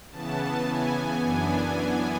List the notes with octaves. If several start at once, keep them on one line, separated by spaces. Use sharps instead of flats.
C#3 E3 B3 A5
G#5
F#2 E3 B3 D4 G#5